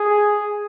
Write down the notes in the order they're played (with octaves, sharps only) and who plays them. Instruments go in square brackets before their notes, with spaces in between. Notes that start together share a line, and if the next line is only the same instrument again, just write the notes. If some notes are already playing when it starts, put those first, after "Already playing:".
Already playing: [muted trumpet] G#4